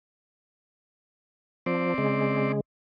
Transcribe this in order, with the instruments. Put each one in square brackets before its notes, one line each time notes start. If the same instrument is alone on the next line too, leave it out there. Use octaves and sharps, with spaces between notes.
[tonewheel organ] F3 [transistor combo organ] C4 D5
[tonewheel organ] C#3 G#3